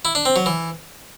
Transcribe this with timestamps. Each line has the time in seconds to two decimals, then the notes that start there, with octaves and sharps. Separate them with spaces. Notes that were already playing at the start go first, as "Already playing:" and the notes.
0.05 E4
0.15 D4
0.25 C4
0.36 F#3
0.46 E3